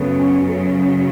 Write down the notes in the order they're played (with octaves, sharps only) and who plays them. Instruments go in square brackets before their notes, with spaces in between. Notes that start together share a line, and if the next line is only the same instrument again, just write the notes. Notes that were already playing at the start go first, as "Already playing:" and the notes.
Already playing: [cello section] F#2 C#3 F#3 [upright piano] A3 B3
[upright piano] C#4
A3